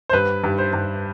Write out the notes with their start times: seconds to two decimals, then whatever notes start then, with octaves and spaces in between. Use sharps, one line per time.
0.09 C5
0.13 G2 B4
0.44 G2
0.58 C5
0.73 G2